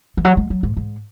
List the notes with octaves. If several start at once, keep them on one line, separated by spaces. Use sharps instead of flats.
E3
F#3
G#3
F#3
G#2
G#2